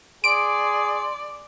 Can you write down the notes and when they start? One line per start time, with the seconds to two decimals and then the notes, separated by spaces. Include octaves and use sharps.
0.24 G#4 D5 C6 D7